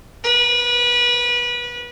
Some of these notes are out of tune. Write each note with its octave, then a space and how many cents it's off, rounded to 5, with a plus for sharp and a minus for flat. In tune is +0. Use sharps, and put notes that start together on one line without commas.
B4 -30